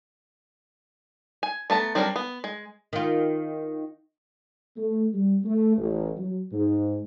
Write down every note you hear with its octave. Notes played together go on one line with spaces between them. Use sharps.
G#5
A3 B3 A5 A#5
F#3 G3 C4 D4 A#4
B3
G#3
D#3 F4
A3
G3
A3
A1
F#3
G#2